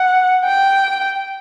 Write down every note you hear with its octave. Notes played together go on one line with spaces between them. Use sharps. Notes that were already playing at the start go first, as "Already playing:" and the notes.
Already playing: F#5
G5